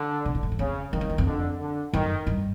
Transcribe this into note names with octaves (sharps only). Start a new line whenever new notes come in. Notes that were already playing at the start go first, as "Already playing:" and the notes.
Already playing: D3
B2
A2
G#2
F#2
F2 C#3
F2 D#3
F#2
E2
F2
D3
D3
F#2 D#3
G2